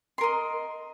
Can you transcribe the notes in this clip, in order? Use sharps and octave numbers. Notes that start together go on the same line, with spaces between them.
A#4 D#5 C6